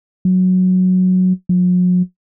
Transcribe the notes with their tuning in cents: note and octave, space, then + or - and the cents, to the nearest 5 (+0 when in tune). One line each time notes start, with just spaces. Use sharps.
F#3 -5
F#3 -45